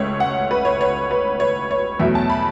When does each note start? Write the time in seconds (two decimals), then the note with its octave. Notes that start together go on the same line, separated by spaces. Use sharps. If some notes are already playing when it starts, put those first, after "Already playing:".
Already playing: C#2 A3 C#5
0.20 F#5
0.51 B4
0.65 C#5
0.81 C#5
1.11 B4
1.40 C#5
1.71 C#5
1.99 E2 B2 F#3 A3 E5
2.15 A5
2.29 B5